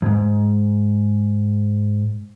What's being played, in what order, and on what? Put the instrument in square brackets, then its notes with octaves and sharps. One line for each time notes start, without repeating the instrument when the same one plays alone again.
[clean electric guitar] F2 G#2